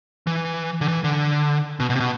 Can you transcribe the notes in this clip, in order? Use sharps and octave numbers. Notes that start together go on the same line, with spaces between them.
E3
D3
E3
D3
B2
B2
C3
B2